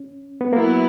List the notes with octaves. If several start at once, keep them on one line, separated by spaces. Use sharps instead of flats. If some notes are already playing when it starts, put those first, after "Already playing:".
Already playing: C#4
B3
F#3 A#3 B3 E4